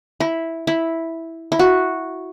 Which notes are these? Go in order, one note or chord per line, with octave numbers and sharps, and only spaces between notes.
E4
E4
E4
F#4